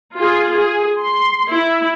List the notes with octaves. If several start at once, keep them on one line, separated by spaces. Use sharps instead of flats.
F4 G#4
G#4
C6
E4